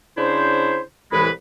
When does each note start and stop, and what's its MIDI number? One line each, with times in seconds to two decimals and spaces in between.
0.18 0.80 49
0.18 0.80 62
0.18 0.80 64
0.18 0.80 72
1.12 1.29 36
1.12 1.29 45
1.12 1.29 52
1.12 1.29 56
1.12 1.29 71
1.12 1.29 83